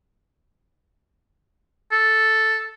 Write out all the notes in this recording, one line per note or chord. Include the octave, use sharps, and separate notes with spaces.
A4